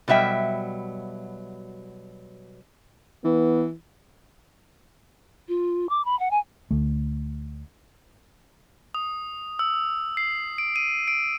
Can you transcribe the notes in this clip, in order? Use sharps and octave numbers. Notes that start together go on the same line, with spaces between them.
B2 F#3 G3 E5 G5
E3 B3
F4
D6
B5
F#5
G#5
D2 A3
D#6
E6
C7
D7
D#7
D7